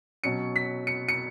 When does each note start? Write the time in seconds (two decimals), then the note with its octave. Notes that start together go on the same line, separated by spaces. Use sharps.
0.24 B2 F#3 C#4 C#7
0.56 B6
0.87 C#7
1.08 C#7